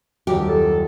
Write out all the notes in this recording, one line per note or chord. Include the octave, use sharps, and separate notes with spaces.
D#1 F#2 G4
A4